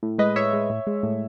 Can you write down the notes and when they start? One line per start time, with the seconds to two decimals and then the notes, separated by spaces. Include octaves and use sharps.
0.03 A2
0.18 G#3 B4 D#5
0.36 A2 C#5 E5
0.53 G#3
0.70 A2
0.87 G#3
1.03 A2